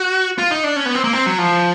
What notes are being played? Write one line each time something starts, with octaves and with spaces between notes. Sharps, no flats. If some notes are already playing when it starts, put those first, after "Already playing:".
Already playing: F#4
F4
D#4
D4
C#4
B3
C4
A#3
C4
F#3
F3